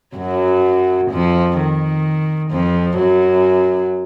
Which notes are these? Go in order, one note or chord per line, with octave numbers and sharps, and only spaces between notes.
F#2 F#3
F2 F3
D#3
F2 F3
F#2 F#3